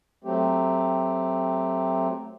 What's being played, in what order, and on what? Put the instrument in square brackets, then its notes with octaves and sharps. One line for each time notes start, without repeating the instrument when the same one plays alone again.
[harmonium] F#3 A3 C4 G4